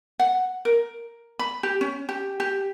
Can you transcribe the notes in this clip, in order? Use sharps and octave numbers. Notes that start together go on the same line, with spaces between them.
F#5
A#4
B5
G4
C#4
G4
G4